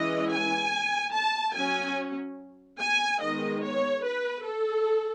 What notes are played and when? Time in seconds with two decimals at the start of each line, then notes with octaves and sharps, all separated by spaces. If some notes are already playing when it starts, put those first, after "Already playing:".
Already playing: E3 G#3 C#4 D#5
0.31 G#5
1.14 A5
1.55 F#3 C#4 G#5
2.79 G#5
3.20 D#3 G#3 B3 D#5
3.62 C#5
4.03 B4
4.44 A4